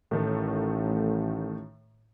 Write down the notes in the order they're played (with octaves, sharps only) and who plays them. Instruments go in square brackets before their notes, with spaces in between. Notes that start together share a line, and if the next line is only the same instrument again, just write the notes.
[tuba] A1 [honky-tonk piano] A2 D#3 A3